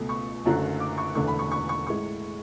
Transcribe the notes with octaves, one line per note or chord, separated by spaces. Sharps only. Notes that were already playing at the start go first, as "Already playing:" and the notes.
Already playing: C#2 B2 A3
C#6
F#1 F#2 D3 F#3 A3
D6
C#6
E1 E2 D3 A3 C#6
B5
C#6
C#6
C#6
A2 G#3 C#6